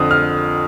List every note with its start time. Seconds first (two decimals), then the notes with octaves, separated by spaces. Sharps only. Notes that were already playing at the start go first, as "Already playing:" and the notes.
Already playing: F2 D3 D#6
0.11 F6